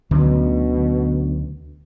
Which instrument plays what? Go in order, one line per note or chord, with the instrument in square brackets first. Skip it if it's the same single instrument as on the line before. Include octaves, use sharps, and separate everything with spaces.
[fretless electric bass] D2 [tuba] B2 [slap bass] D3 F#3 C#4